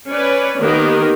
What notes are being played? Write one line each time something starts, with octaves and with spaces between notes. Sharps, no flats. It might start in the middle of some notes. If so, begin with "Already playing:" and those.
C#4 B4 C#5 D5
D#3 A#3 B3 G4 A#4